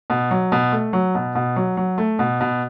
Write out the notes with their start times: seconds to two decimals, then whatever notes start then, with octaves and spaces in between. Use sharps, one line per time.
0.10 B2
0.31 F#3
0.52 B2
0.72 A3
0.93 F#3
1.15 B2
1.35 B2
1.56 F#3
1.77 F#3
1.98 A3
2.19 B2
2.41 B2